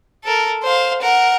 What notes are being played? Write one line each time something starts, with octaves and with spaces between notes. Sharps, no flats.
A4 A#4
C5 F5
A#4 F#5